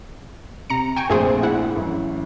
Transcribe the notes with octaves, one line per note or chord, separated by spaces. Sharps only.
C3 A#5 C#7
G5 G#5 C#6 D7
A#1 F2 A3 G#4 C5
E4 F#5
A1 F#2